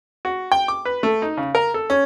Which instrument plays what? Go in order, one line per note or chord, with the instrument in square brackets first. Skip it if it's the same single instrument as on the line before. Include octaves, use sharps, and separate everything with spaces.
[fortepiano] F#4
G5
D6
B4
A3
D#4
C#3
A#4
A4
C#4